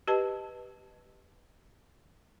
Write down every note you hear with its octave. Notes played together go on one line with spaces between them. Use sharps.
G4 B4 D#5 A5